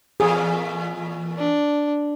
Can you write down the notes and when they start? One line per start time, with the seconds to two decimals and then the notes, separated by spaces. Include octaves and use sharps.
0.20 E2 A#2 G#4
1.38 D4